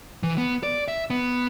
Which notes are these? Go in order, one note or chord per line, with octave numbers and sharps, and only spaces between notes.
E3
B3
D5
E5
B3